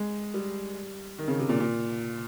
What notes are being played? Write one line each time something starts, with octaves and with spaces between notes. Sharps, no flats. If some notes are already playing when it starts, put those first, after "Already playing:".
Already playing: G#3
G3
D#3
C#3
C3
A#2
A#2